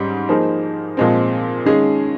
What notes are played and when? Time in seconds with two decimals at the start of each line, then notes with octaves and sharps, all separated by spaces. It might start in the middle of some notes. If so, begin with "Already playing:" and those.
Already playing: G#2 G3 C#4
0.29 F3 A#3 D#4 G#4 C5
0.97 A#2 F3 G#3 C4
1.65 D#3 G#3 C#4 G#4